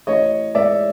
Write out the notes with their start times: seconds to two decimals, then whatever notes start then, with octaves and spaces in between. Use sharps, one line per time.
0.07 A1 C#5 D#5
0.55 G#2 D5 E5